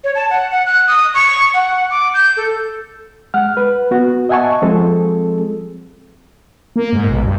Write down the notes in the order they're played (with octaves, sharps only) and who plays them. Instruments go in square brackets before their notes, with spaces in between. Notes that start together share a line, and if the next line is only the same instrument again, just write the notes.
[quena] C#5
A5
F#5
F#5
F#6
D#6
C#6
F#5
D6
G6
A4
[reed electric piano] G#3 F#5 F6
B4
B3 F#4
D#5 E5 F#5 G#5 A5 C#6
F3 G#3 C4 G#4 A4
[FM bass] A#3
G#2
B1
G2